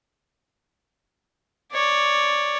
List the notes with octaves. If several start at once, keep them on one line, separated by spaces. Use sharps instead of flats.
C#5 D5